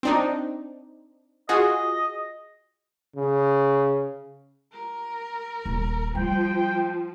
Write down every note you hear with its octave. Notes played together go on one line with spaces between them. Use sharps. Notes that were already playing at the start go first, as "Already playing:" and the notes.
C4 D4 D#4
F4 F#4 G#4 D#5
C#3
A#4
D#1
F3 G3 G5